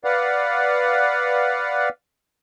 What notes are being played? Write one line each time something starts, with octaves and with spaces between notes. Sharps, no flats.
B4 D5 F5 F#5